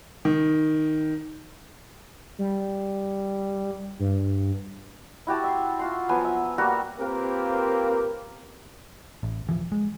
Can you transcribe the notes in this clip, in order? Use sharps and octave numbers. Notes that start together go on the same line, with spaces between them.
D#3
G3
G2
E4 F#4 G4 A5
E5 C6
F4 F#4 C6
F3 F#3 B3 G#5
E5
G3 A#3 F#4 G4
A#3 C4 F4 G4 A#4 B4
A1
E1 E3 F3
G#3